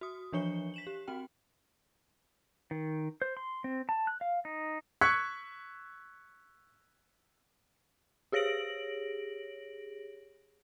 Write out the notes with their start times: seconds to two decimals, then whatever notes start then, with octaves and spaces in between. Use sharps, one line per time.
0.01 F#4 D#6
0.32 E3 F3 D4 C#5 C#7 G7
0.74 B6 E7 F#7
0.87 G4
1.08 C4 F#4 G5
2.71 D#3
3.22 C5
3.37 C6
3.64 C4
3.89 A5
4.07 F#6
4.21 F5
4.45 D#4
5.01 C#6 E6 F#6 G#6 B6 C#7
8.32 G4 G#4 C#5 A#6 D7 F#7